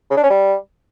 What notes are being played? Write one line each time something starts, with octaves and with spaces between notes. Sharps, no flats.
C#3
D4
C#4
G3